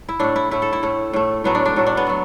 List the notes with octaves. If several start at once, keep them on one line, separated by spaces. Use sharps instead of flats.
E4
A2 A3 D4
E4
A2 A3 E4
A4
E4
A2 A3
A2 A3
A2 F#3 A3 B3
D4
D4
A2 F#3 A3
D4
B3
F#3 A3